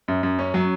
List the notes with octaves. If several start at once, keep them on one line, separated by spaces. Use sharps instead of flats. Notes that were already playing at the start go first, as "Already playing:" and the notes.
F#2
F#2
C#4
F#3